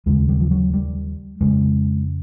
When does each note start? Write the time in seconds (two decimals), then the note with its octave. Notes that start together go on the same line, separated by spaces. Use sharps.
0.06 D#2 C#3 G#3
0.29 G3
0.40 F3
0.51 F#3
0.74 G3
1.41 F2 C#3 G#3